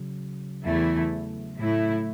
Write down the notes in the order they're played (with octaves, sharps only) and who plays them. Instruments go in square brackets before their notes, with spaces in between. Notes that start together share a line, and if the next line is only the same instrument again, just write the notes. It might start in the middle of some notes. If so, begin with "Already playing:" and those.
Already playing: [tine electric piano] C#3 F#3
[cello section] E2 E3 A3 E4
A2 A3 E4